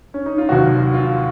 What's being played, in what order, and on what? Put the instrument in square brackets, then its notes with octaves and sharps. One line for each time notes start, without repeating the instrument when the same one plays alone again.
[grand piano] C#4
D#4
F4
[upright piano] F1 D#2 D#3 F#3 [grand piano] F#4
[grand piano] F4